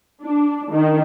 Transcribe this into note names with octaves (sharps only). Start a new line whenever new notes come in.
D4
D#3